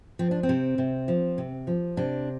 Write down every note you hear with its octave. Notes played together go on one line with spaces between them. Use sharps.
F3 C4
D4
C4
C3
C3
F3
C3
F3
C3 D4